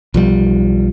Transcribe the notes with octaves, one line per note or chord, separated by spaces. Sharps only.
B1 F3 G3